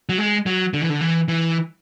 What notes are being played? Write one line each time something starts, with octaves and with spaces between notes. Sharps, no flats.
F#3
G#3
F#3
D3
E3
D3
E3
E3